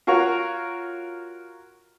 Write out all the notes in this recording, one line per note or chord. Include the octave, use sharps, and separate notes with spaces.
F4 F#4 A#4 C#5 A#5